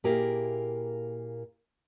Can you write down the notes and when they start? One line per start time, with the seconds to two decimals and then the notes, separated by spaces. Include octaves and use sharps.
0.04 A#2 A#3 E4 G4 G#4 A#4